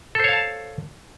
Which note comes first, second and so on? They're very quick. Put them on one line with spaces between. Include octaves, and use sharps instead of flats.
A4 C5 C#5 F5 A5